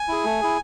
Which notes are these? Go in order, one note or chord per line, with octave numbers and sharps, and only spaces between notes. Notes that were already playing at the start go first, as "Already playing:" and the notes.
Already playing: G#5
E4 G#4
A3
E4 G#4